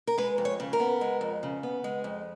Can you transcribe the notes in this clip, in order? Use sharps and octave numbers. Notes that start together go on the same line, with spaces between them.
A#4
G#3 B4
F2
C#5
C#3
A#4
B3
G#3
F2
C#3
B3
G#3
F2